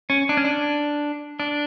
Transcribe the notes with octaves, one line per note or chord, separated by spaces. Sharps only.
C#4
D4
C#4
D4
D4